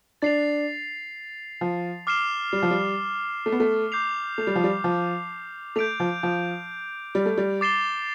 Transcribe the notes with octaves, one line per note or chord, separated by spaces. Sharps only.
D4 A6 C7 F7
F3
D6 F6 C7 E7 G7
G3
F3
G3
A3
B3
A3
D6 G6 C7 F7
A3
G3
F3
G3
F3
A3 G6 D7 F7
F3
F3
G3
A3
G3
D6 A6 C7 E7 G7